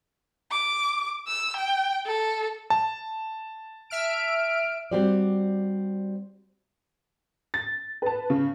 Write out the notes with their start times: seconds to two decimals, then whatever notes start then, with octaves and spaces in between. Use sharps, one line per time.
0.51 D6
1.28 E6
1.57 G5
2.06 A4
2.70 A5
3.90 E5 F6 D7
4.91 G3 C4 F#4 G4 C5 D5
7.54 A6
8.02 B4 A5
8.30 C#3